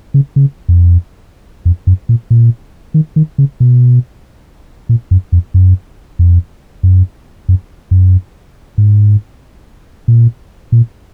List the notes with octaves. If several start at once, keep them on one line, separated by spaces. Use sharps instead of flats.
C#3
C#3
F2
F2
F#2
A#2
A#2
D#3
D#3
C#3
B2
A#2
F#2
F2
F#2
F2
F#2
F#2
F#2
G#2
A#2
A#2